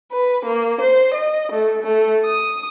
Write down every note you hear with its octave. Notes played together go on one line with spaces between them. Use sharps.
B4
A#3
C5
D#5
A3
A3
D#6